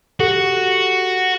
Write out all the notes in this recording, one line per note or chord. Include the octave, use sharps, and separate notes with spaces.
F#4 G4 A4